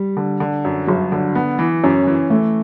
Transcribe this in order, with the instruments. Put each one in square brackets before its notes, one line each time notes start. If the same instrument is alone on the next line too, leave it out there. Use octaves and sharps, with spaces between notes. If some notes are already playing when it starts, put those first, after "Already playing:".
Already playing: [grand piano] G3
[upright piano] D3
D3
F#2
[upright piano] G1 [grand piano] F#3
[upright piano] D3
B3
E3
[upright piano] F#2 [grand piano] C#4
[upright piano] E3
[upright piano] E3 [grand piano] A3